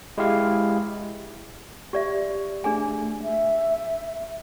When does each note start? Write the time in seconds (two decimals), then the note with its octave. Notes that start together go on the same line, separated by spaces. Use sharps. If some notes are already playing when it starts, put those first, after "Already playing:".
0.18 G#3 E4 G4 F5
1.93 G4 D5 E5
2.64 A3 D4 G#4 G#5
3.23 E5